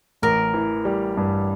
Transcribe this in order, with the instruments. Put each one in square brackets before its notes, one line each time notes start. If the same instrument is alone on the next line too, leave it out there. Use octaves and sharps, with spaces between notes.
[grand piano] A1 [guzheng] A#4
[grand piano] E3
G3
G2